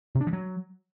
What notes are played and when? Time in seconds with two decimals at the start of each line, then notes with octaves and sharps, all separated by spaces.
0.15 C3
0.21 D4
0.27 F3
0.33 F#3